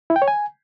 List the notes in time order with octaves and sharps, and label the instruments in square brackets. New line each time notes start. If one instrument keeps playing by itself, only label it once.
[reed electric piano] E4
G5
C#5
G#5